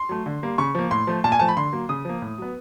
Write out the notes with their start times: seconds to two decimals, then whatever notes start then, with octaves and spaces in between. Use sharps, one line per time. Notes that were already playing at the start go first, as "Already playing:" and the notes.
Already playing: C6
0.09 F#3 A3
0.26 D3
0.43 G3 A#3
0.58 C#3 C#6
0.75 F3 A#3
0.91 A2 C6
1.07 F3 A3
1.24 A#2 A5
1.32 G#5
1.39 F3 A3 A5
1.48 B5
1.57 D3 C6
1.73 F#3 A#3
1.89 C#3 D#6
2.05 F3 A#3
2.22 A2
2.38 F#3 B3